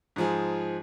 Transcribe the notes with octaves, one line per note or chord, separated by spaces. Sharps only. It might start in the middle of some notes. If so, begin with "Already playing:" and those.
G#2 F3 G#4